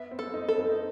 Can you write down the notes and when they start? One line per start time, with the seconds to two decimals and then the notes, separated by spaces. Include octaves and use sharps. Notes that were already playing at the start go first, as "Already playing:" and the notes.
Already playing: B3 E5
0.11 C4
0.19 A4
0.34 D#4
0.49 A4
0.56 C4
0.69 D#4